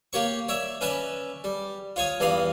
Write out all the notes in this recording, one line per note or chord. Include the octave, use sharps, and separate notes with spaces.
A#3 G4 C#5 C#6
C#5 D5 E5
C#4 B4 D5 E5 A5
G3
F4 C#5 G#5 D#6
E2 G2 D#5 F5 B5 D#6